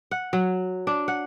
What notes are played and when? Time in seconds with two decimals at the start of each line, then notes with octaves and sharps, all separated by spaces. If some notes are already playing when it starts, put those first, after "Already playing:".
0.11 F#5
0.33 F#3
0.87 D4
1.08 F#5